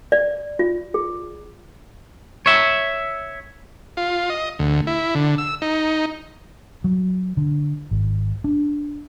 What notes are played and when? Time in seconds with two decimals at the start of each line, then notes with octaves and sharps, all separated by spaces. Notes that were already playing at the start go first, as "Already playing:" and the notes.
0.12 D5
0.59 F4
0.94 G#4
2.46 C#5 E5
3.97 F4
4.30 D#5
4.59 D2
4.87 E4
5.15 D3
5.38 E6
5.62 D#4
6.84 F#3
7.37 D3
7.91 G#1
8.44 D4